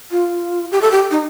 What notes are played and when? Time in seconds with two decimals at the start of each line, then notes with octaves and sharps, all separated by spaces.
0.11 F4
0.71 G4
0.82 A4
0.92 G4
1.11 D#4